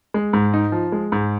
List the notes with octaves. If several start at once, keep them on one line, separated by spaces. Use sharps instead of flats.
G#3
G#2
D#4
F3
G#3
G#2